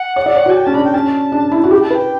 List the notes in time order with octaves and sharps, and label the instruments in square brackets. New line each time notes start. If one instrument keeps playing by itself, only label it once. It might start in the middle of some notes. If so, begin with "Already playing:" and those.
Already playing: [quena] F#5
[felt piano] C#5
D5
C#5
F#4
[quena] A5
G5
[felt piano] C#4 [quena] A5
[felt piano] D4 [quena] B5
[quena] G5
[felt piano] C#4 [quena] A5
[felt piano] D4
E4
F#4
[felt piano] G4 [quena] G5
[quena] A5
[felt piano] B4
[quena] G5